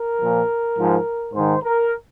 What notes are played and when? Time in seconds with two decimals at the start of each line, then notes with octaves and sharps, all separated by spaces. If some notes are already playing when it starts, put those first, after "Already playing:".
Already playing: A#4
0.22 A#2 F3
0.78 G#2 F3
1.34 G#2 D#3 C5
1.64 A#4